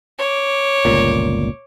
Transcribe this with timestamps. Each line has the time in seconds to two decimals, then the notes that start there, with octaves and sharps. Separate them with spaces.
0.18 C#5 D6
0.85 G1 C#2 A#2